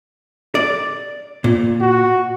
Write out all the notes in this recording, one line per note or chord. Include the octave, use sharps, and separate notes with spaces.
D5
A#2
F#4